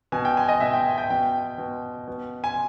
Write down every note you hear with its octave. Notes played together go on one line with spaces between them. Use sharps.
B2 G#5
G5
G#5
D#5
B2 E5
G5
G5
B2 G5
B2
B2
G#5